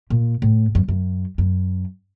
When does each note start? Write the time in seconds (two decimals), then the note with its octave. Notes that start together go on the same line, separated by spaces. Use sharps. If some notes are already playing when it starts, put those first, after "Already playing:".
0.10 A#2
0.42 A2
0.75 F#2
0.88 F#2
1.38 F#2